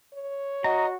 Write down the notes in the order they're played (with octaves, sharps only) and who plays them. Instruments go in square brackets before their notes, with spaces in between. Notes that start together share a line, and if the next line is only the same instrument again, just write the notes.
[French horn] C#5
[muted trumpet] F#4 [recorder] D#5 [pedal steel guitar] A#5